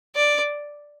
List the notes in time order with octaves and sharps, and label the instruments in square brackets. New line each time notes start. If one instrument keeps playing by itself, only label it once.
[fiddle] D5